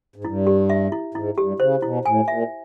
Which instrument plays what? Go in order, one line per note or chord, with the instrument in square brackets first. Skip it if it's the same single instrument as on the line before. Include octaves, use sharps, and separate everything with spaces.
[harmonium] G#2
[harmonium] G2 [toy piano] E4
[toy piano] G4
E5
E4
[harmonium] G#2 [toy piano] E4
[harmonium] G2 [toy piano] G4
[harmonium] C#3 [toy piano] C5
[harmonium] B2 [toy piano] E4
[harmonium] A2 [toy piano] G#5
[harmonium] A#2 [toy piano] E5